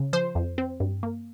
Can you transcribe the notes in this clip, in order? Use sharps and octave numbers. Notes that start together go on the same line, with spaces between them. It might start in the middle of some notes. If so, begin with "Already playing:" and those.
Already playing: C#3
F3 C5
F2
C4
G2
A#3